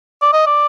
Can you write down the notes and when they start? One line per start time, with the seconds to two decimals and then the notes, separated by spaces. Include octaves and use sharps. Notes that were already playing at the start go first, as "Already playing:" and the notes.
0.22 D5
0.33 D#5
0.47 D5